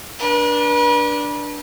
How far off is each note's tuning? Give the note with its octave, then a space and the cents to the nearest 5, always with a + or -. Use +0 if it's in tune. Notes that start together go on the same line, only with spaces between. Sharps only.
D4 +0 B4 -40